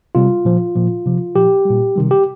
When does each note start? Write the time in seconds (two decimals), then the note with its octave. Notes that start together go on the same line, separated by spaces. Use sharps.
0.15 C3 G3 F4
0.45 A#2 F3
0.75 A#2 F3
1.06 C3 F3
1.35 A#2 F3 G4
1.65 G3
1.71 A#2
1.96 C3 D#3 G3
2.11 G4